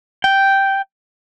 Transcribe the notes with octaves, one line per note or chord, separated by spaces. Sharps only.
G5